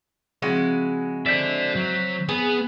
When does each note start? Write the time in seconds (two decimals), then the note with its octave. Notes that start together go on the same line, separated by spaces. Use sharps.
0.42 C#3 F3 G#3 C4 E4 F#4
1.26 A4 C5 D5 E5
1.76 F#3
2.29 B3 G#4